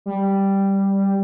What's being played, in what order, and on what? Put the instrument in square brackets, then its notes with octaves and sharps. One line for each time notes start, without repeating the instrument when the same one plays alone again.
[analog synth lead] G3